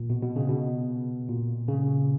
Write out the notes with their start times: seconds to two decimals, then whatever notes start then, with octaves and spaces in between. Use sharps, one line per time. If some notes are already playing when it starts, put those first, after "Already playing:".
Already playing: A#2
0.10 B2
0.23 B2
0.36 C#3
0.49 B2
1.28 A#2
1.68 C#3